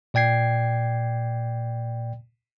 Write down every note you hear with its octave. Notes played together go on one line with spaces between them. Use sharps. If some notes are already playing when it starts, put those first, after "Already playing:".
A#2 D5 G5 G#6 C7